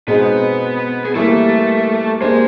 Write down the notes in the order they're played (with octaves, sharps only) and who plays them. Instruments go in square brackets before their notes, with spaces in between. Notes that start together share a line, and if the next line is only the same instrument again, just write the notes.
[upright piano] B2 G#3 C4 D#4 [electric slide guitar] B3 B4
[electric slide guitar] G#4
[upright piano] E3 G3 A#3 [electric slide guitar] A3 A4
[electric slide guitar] G#3 G#4 [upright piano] A#3 D4 G4 C5